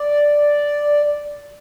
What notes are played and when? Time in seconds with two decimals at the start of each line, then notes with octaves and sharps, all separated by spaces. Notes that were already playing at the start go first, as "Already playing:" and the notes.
Already playing: D5